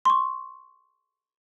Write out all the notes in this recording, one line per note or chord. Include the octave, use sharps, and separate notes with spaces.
C6 C#6